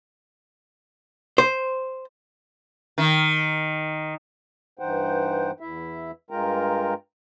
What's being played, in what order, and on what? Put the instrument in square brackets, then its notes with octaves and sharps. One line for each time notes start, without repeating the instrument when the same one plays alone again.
[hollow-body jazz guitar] C5
[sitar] D#3
[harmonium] G2 E3 D#4 C5 F#5 G5
E2 E4 E5
G2 G#3 F4 A#4 G5 A#5